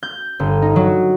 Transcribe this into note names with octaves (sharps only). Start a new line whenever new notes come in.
G6
G1
D#4
F#3